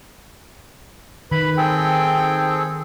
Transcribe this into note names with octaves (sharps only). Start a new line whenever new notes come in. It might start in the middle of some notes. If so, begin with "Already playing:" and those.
D#3 B4 B5
C4 G#4 A4 G5